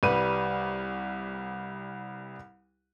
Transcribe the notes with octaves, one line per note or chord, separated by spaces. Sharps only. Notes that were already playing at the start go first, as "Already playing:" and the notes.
C2 G3 B4 D#7